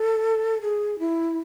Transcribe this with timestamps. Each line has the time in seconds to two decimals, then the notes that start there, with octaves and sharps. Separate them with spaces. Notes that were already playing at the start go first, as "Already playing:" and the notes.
Already playing: A4
0.62 G#4
0.99 E4